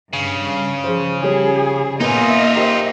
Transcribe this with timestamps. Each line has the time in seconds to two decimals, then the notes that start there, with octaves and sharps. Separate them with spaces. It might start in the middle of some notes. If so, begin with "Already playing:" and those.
0.13 G2 C#3
0.84 F3 G#4 C5
1.23 F3 G3 C#4 G#4
2.00 A#2 A#3 B3 D#4 F4 D#5 E5 G#5
2.55 G4 A#4 C5